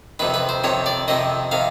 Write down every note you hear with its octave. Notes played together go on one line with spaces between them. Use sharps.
F2 C3 D#3 B4
B4
C5
F2 C3 D#3 C#5
D5
F2 C3 D#3 D#5
C3 D#3 F5